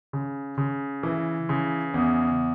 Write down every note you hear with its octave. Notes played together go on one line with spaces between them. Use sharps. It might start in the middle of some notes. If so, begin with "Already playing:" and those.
C#3
C#3
E3
C#3
E2